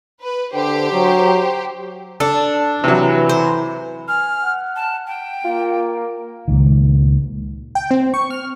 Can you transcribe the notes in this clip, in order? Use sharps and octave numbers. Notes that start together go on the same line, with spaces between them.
B4
D3 G4 C5
F#3
D4 A4
C3 E3 F#3
C5
G#5 F6
F#5
A5
G5
A#3 F4
C#2 A#2 D#3
G5
C4
C#6
F6